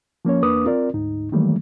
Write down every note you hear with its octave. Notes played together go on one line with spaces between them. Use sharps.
F3 A#3 C#4 C#5
E2 A#3 D4 B4 D6 D#6
C4 F4 A#4 D5
D2 G#2 D#4
D#3 E3 F#3 G3 A3 A#3